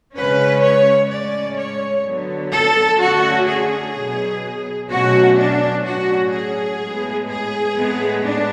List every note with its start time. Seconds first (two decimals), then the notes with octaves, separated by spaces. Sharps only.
0.15 C#3 G#3 C#4 B4
0.62 C#5
1.09 A2 G#3 C#4 D5
1.57 C#5
2.05 D3 F#3 B3
2.52 A4
2.99 D3 A3 C#4 F#4
3.47 G#4
3.94 B2 F#3 B3
4.90 B2 F#3 A3 C#4 F#4
5.37 D4
5.84 A2 F#3 C#4 F#4
6.32 G#4
6.80 A2 G#3 B3
7.27 G#4
7.75 A2 G#3 B3
8.22 D4